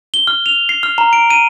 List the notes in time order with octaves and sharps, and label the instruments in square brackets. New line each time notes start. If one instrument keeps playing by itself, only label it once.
[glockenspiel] G7
F6
F7
C7
F6
A#5
D7
D#7